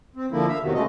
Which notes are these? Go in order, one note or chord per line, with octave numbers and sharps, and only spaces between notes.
C4
D3 F3 A#3 E4
E5 F5
E2 C3 D#3 F#3
C#3 G#3 A3 D#5